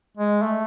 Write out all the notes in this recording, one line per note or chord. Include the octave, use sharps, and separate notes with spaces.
G#3
A3